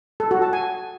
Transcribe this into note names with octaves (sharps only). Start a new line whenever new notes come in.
A4
F#4
A5
G#5